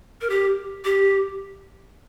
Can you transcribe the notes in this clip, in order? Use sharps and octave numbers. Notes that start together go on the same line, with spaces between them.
A#4
G4
G4